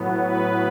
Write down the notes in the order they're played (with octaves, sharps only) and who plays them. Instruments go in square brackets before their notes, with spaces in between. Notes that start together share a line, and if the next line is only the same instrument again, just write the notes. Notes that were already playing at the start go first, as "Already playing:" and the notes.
Already playing: [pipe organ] A2 F#3 B3
B4